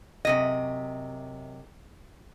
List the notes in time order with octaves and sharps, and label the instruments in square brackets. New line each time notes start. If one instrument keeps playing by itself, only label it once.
[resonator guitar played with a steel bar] F#2 C3 D#5